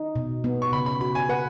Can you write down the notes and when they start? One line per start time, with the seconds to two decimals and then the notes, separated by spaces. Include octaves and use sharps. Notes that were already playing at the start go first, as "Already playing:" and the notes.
Already playing: D#4
0.16 B2
0.44 B3
0.62 C#6
0.72 C#3 B5
0.86 B5
1.01 F#4 B5
1.15 G#5
1.29 B4 F#5